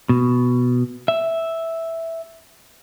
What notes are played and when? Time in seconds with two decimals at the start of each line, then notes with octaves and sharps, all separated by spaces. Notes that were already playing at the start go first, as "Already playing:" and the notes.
0.09 B2
1.08 E5